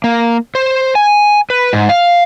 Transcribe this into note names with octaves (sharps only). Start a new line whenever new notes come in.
A#3
C5
G#5
B4
G#2
F5